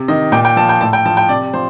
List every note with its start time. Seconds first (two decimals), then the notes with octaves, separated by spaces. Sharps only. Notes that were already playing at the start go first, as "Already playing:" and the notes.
Already playing: C3
0.08 D#3 D#5
0.32 A#2 G5
0.45 G5
0.57 F3 A5
0.69 G5
0.81 A2 A5
0.93 G5
1.05 F3 A5
1.17 G5
1.29 C3 D5
1.53 F3 C5